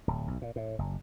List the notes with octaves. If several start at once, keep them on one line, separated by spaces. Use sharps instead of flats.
D1
B1
A#2
A2
F#1